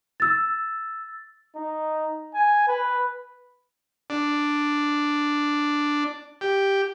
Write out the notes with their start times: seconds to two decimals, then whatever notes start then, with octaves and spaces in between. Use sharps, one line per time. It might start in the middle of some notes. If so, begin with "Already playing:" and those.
0.20 E6 A6
1.56 D#4
2.35 G#5
2.68 B4
4.10 D4
6.41 G4